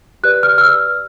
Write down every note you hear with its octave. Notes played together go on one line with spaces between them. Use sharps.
G4 B4 D5 F#6
F6
F6
E6